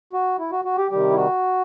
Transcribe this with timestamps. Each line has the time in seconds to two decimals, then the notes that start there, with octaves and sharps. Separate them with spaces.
0.13 F#4
0.39 E4
0.52 F#4
0.65 F#4
0.78 G4
0.91 C3 D#3 G3 G4
1.11 E4
1.17 F#4